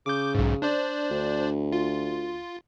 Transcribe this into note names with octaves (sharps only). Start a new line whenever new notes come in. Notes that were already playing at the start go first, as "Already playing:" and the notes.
C#3 D6 G6
B1 G#2
D4 C5 D5
D2
F4